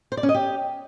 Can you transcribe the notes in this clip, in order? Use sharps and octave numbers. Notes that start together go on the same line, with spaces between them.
C5
D5
C#4
D#5
G4